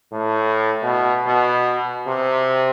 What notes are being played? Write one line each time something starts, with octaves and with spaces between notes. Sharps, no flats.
A2
B2
B2
C3